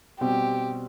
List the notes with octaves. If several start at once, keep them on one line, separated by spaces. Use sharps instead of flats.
B2 G3 C4 G4